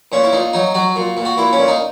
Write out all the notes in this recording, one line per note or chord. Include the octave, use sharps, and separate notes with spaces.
A#2 C#4
E4
A#2 D#4
F#3 D#4
F#3 F#4
A#2
A#2
F#4
A#2 E4
C#4
A#2
D#4